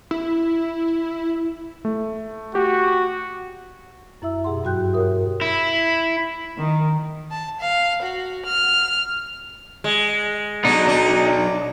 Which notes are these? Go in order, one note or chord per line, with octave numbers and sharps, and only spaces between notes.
E4
A3
F#4 G4
F#2 E4 E5 E6
B2 G4 G#4 F#5 C6
G2 F#3 F#4 G5 F#6 G6
G4 A#4 C#5 E5 D#6
E4
D#3
A5
F5
F#4
F6
G#3
B2 F#3 D4 D#4
D4